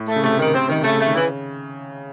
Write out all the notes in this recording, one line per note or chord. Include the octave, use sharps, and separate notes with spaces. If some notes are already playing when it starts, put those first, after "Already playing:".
Already playing: A2
A3
C#3
C3 A3
D#3
C3 C4
D#3
C#3 A3
A3
D#3
C#3 E3